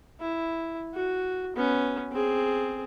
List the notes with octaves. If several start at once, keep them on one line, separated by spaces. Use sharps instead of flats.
E4
F#4
B3 C#4
C4 G#4